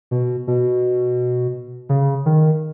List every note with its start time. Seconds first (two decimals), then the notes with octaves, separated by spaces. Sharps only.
0.11 B2
0.47 B2
1.89 C#3
2.26 D#3